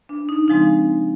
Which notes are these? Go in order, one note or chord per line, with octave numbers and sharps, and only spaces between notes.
D4
D#4
C#3 F3 G#3 C4 D#4